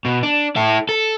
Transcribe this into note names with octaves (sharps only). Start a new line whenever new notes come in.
B2
D4
E4 A4
A4